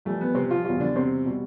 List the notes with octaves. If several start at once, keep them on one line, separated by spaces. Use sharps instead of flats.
F2 E3 G3 A3
B3
C3 C4
F3 F4
E2 B2 F3 G3 F4
D3 D4
C3 C4
B2 G3